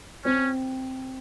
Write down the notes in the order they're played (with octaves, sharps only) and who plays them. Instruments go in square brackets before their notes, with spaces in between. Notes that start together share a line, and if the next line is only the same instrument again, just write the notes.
[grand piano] C4 [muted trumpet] C#4